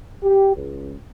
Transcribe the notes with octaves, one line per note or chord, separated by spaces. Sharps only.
G4
C#2